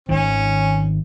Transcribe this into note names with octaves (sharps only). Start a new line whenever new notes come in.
G#1 D#3 C#4